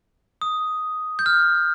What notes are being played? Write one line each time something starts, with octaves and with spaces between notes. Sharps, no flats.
D#6
G6
F6